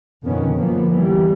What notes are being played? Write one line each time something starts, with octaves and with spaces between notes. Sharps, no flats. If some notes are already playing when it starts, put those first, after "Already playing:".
F2 B2 D3 D#3 B3 C#4
D3 F3 F#3 A#3 B3
E3 G3